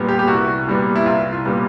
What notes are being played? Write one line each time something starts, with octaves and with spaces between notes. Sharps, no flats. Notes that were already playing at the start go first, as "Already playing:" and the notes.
Already playing: A#2 G3 B3
G4
G4
C2 F#4
A#2 G3 B3
E4
C2 F4
F4
A#2 G3 B3